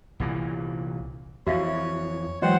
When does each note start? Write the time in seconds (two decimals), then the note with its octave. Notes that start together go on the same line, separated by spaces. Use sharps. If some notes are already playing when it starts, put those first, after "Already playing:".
0.20 C2 A#2 E3
1.47 F2 E3 F#4 C#5 E5 F5
2.42 E3 F#3 G#3 C5 D#5 F#5 G5